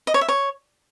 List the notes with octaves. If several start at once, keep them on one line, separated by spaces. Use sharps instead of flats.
D#5
C#5
E5
C#5